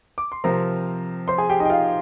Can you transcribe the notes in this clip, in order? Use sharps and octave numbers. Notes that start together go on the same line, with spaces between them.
D6
C6
C3 F3 C4 A#4 A#5
C5 C6
G#4 G#5
G4 G5
D#4 D#5
G5
F4 F5